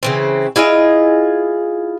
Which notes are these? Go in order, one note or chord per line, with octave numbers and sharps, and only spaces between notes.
C#3 E3 C4
E4 F4 G#4 D#5